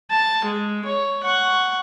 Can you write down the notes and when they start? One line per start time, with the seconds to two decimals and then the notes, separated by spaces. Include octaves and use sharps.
0.10 A5
0.45 G#3
0.85 C#5
1.23 F#5 C#6